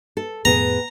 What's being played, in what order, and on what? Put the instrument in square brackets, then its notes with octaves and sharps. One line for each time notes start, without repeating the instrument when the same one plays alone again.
[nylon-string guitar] A4
[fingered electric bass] F2 A2 [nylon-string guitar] B3 G#4 [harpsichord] A#5